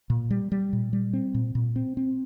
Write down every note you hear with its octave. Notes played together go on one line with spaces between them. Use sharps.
A#2
G3
G3
A#2
G3
C4
A#2
A#2
C4
C4